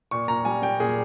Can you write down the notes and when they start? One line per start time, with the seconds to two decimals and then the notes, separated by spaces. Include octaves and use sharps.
0.11 A#2 C#6
0.28 A#2 A#5
0.45 G3 G#5
0.62 G3 G5
0.80 A#2 G#4